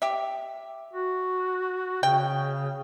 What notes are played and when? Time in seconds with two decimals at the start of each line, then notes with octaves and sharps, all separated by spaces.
0.02 G4 E5
0.93 F#4
2.03 C#3 G5